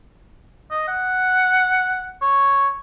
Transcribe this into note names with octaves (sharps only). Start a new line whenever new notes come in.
D#5
F#5
C#5